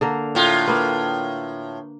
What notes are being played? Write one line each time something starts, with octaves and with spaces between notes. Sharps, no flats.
D3 A#3 A#4
A2 F4
A#3 B4